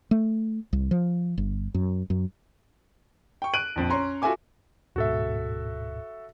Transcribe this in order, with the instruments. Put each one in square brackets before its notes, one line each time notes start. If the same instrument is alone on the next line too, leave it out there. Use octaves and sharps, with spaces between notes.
[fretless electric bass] A3
C2
F3
G1
F#2
F#2
[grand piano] G5 C#6
F#6 D7 D#7 F#7
A#1 F2
C#4 C#5 A#5 C6
F4 F#4 A4 E5 G#5 D6
[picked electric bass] D1 G#2 B2 [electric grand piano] F#4 A4 E5